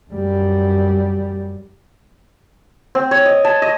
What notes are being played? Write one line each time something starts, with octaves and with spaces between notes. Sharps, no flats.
F#2 G3
C4
C#5
D#5
A5
D#5